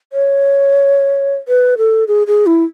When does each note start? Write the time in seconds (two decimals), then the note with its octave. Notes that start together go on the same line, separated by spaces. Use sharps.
0.13 C#5
1.48 B4
1.78 A4
2.08 G#4
2.27 G#4
2.46 E4